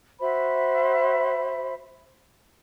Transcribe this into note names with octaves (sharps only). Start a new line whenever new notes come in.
F#4 C5 E5 B5